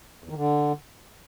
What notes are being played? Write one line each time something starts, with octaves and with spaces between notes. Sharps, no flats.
E2
D#3
D3